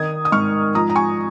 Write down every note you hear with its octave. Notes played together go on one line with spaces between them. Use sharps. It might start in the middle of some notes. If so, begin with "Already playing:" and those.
Already playing: D#3 D#6 G#6
D#6
G#2 C#6 F6
F3 A#5 D#6
A#5
G#5 C#6